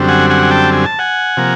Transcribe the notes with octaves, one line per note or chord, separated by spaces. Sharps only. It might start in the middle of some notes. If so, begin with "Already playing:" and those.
Already playing: F#2 D3 G3 C4
F#5 G#5
F#5 G#5
G#5
G5 A5
G#5
A5
F#5 G#5
C3 F3 A#3